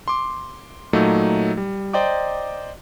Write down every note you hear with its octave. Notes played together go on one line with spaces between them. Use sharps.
C6 D6
A#2 F#3 A3 D#4
G3
C5 D5 D#5 G5 A#5 D6